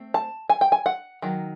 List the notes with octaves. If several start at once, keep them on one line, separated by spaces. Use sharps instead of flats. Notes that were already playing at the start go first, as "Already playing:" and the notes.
Already playing: A3 C4
A5
G#5
G5
G#5
F#5
D#3 F#3